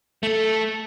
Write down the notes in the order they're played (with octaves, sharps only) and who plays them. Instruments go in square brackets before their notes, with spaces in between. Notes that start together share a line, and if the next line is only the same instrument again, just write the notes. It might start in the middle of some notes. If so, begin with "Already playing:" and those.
[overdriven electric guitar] A3 A4